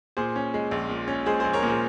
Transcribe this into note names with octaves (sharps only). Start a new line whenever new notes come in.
A#2 G#4 C5
C#4
G#3
A#1
A#2
C#4
G#3 G#4 C5
G#4 C5
A#1
A#4 C#5
A#2
G#4 C5